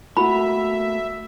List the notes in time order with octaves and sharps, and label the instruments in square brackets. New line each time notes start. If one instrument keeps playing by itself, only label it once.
[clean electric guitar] A3 A#3 [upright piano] F#4 [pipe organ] E5 [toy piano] B5